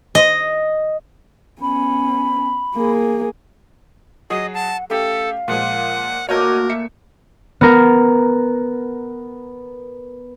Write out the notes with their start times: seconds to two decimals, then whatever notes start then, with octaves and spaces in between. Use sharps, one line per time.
0.15 D#5
1.62 B3 C#4 B5
2.76 A#3 G#4
4.30 F#3 F#4 G#4 D#5
4.54 F#5 A5
4.90 A3 C#4 G4 A4 F5
5.48 A#2 F3 G#3 F#5
6.29 A#2 A3 A#3 F#4 A#4 C#5 D#5 G6
6.69 E5 C#7
7.61 B3 A#4